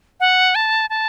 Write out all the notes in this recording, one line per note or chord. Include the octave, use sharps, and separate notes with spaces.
F#5
A5
A5